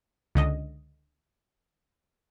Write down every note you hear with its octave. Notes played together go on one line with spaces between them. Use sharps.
C#2 D3 D#5